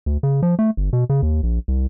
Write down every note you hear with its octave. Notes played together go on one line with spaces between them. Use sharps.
D2
C#3
F3
A3
G1
B2
C#3
D#2
A#1
C2